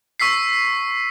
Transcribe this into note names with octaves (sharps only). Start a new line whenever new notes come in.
C#6 E6 B6 C7